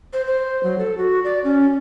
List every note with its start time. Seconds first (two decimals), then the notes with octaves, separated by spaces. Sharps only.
0.13 C5
0.27 C5
0.63 F#3
0.78 A4
0.98 F#4
1.24 D5
1.44 C#4